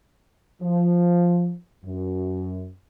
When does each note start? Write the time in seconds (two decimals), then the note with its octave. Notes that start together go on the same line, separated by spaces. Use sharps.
0.62 F3
1.85 F#2